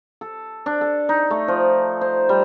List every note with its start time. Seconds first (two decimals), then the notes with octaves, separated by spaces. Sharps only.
0.21 A4
0.66 D4
0.81 A4
1.09 D#4
1.30 A3
1.48 F3
2.01 C5
2.29 G3